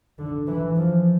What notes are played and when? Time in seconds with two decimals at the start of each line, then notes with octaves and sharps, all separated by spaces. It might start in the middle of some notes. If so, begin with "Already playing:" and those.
0.18 D3
0.47 E3
0.76 F3